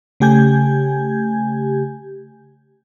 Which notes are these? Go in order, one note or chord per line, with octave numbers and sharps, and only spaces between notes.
C#3 A3 G4 G#5 G6 G#6